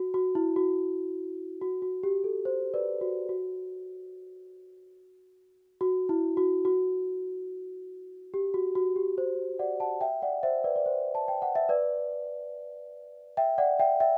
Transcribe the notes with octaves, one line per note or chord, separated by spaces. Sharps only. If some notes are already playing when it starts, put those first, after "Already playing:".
Already playing: F#4
F#4
E4
F#4
F#4
F#4
G4
A4
C5
B4 D5
F#4
F#4
F#4
E4
F#4
F#4
G4
F#4
F#4
G4
C5
D5 F#5
F#5 A5
E5 G5
D5 F#5
C5 E5
B4 D5
D5
C5
A5
G5
F#5
E5
B4 D5
E5 G5
D5 F#5
E5 G5
E5 G5